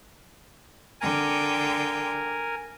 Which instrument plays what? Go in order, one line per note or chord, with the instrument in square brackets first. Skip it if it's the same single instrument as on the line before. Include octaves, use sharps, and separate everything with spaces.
[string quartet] D3 G5 [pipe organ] A#4 G#5